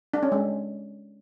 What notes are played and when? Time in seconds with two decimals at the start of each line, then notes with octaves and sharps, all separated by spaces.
0.14 D4
0.23 C#4
0.32 G#3